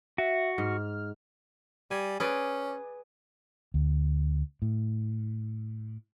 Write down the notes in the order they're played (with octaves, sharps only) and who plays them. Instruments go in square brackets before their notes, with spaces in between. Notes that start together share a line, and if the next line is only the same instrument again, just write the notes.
[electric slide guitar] F#4 [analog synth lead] E5
[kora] G#2 [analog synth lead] F6
[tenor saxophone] G3 [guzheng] G#5
[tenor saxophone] C#4 [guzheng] G#4 B4 D5
[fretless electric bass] D2
A2